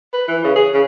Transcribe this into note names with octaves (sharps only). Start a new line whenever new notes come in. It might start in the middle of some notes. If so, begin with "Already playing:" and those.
B4
E3
C#3
G#4
C#3